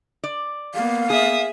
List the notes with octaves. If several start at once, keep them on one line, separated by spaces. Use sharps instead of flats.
D5
A#3 B3 F5
G#4 E5 D#6